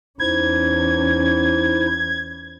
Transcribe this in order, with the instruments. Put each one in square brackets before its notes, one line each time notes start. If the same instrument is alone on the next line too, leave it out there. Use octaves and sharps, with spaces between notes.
[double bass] E2 C#4 [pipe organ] D#4 E4 C5 [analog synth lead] G#6